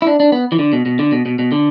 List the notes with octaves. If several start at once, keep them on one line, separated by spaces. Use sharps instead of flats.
E4
D4
D4
B3
E3
D3
B2
B2
D3
B2
B2
B2
D3